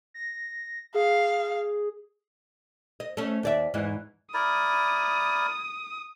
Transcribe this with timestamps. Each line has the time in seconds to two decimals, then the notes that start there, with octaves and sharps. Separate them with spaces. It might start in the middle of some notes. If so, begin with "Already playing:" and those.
0.14 A#6
0.94 G#4 F5
3.00 D#5
3.17 A3 C#4
3.43 D#2 D5 E5
3.74 E2 G#2 E3
4.34 E4 A#4 D5 D#6